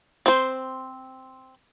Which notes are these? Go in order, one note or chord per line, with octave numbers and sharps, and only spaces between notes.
C4 C5